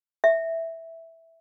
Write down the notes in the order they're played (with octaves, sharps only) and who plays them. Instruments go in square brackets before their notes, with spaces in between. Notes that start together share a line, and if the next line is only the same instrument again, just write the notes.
[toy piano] E5